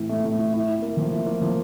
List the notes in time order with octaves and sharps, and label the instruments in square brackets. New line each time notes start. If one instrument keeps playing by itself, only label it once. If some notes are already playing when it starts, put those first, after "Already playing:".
Already playing: [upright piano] A2 E3
A3
A2
A2
E4
E4
A#3
F3
E4
A#3
F3